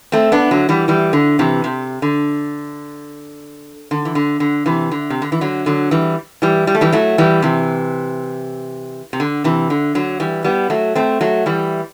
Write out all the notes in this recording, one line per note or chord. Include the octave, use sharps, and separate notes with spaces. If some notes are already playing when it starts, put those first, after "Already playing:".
A3 C4
B3 D4
D3 F#3
E3 G3
E3 G3
D3
C3 E3
C3
D3
D3
E3
D3
D3
C3 E3
D3
C3
D3
E3
D3 F#3
D3 F#3
E3 G3
E3 G3
G3
A3
E3 G3
F#3 A3
E3 G3
C3 E3
C3
D3
C3 E3
D3
D3 F#3
E3 G3
G3 B3
F#3 A3
A3 C4
F#3 A3
E3 G3